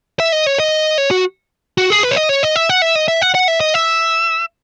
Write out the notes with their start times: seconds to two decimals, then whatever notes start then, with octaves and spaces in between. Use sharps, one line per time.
0.20 E5
0.32 D#5
0.46 C#5
0.60 D#5
0.98 C#5
1.11 F#4
1.78 F#4
1.90 G#4
2.03 B4
2.11 C#5
2.16 D#5
2.29 C#5
2.43 D#5
2.56 E5
2.70 F#5
2.82 E5
2.96 D#5
3.08 E5
3.22 F#5
3.35 F#5
3.48 E5
3.61 D#5
3.74 E5